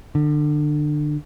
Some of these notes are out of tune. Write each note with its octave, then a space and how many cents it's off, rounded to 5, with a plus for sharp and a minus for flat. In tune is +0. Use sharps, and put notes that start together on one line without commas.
D3 +25